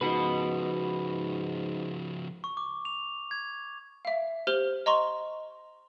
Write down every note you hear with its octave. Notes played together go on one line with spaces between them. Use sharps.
G#2 C#3 F3 F#4 B4
C#6
D6
F7
G#6
E5 F5
G4 C5 F6 F#7 G7
D#5 A#5 C6 C#6